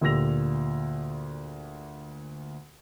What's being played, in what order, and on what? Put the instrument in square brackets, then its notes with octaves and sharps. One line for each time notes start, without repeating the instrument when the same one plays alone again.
[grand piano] D2 A#2 G4 E6 A#6 F7